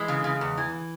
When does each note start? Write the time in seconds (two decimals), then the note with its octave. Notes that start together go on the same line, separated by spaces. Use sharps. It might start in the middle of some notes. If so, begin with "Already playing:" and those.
Already playing: E3 G#3
0.08 C#3
0.24 C#3
0.41 E2
0.57 E3